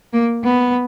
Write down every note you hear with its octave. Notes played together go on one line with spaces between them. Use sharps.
A#3
B3